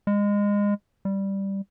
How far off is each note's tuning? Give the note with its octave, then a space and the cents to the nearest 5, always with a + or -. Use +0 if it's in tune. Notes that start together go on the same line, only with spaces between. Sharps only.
G#3 -25
G3 +0